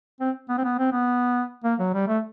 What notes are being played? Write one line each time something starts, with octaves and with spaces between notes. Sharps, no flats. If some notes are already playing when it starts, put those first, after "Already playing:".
C4
B3
C4
B3
C4
B3
A#3
F#3
G3
A3